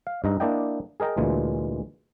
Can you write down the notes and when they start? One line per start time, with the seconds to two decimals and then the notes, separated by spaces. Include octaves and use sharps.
0.07 F5
0.24 G2 D#4 A#5
0.40 A#3 D4 E4 D5 D#5 G5
1.00 G#4 A#4 D#5 G5 A#5
1.17 D2 A#2 E3 G#3